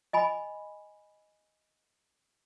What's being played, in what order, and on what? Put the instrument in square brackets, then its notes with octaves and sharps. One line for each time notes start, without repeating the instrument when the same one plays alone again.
[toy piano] D#5 G#5 B5